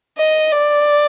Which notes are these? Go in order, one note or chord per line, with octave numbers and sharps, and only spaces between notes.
D#5
D5